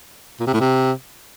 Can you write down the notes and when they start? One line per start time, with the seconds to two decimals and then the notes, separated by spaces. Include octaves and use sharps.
0.40 A#2
0.47 C3
0.53 A2
0.60 C3